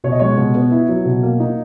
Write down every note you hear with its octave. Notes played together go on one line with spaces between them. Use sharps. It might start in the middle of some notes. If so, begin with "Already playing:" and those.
B2 C#5
D#5
G#3 C#5
B2
B3
E4
F#3
B2
A#3
D#4